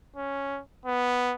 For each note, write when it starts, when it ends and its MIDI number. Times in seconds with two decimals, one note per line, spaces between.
0.16 0.60 61
0.86 1.35 59